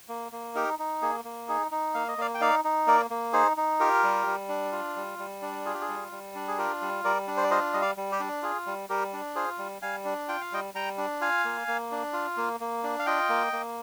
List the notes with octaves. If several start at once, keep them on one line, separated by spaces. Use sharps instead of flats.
A#3
A#3
D#4 G4 A#4
D#4
A#3 G#4
A#3
D#4 G#4
D#4
A#3 F5
D#5
A#3 D5 F5
G5
D#4 D5 F5
D#4
A#3 A#4 D5
A#3
D#4 G#4 C5
D#4
F4 G4 A#4
G3
G3
D4
F4
G3
G3
D4
F4 G#4
G4
G#4
G3
G3
D4
G#4
F4 G4 A#4
G3
G3 A#4 D5
D4
C5
D5
F4 C5 D#5
G3 D#5
D5 F5
G3
G4
D4
F4 G#4
G3
G3 G4 A#4
D4
F4 G#4 C5
G3
G3 F5 G#5
D4
F4 G5
F5
G3 D#5 G5
G3 G5 A#5
D4
F4 F5 G#5
A#3
A#3
D4
F4
A#3
A#3
D4
F5
F4 D#5 G5
A#3
A#3